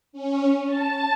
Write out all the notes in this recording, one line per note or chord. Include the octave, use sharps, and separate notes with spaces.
C#4
A5